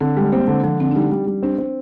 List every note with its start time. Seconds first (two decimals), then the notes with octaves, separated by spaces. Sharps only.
0.01 D3 C4
0.17 G3 G#3
0.33 A#3 C4
0.47 D3 G#3
0.63 D3 F3
0.80 D3 C4
0.91 D4
0.95 G3 D#4
1.11 G3
1.27 G3
1.43 C4 D4
1.58 C4